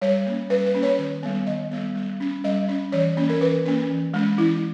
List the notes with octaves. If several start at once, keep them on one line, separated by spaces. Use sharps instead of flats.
G3 C#5
A#3 C#4
G3 B4
B4
A#3 C#4
C#5
D#3 C#5
G3 B3
D#3 D#5
G3 B3
G3
C#4
G3 D#5
C#4
E3 C#5
A#3 C#4
A#4
E3 B4
A#3 C#4
E3
G#3 C#4
E3 E4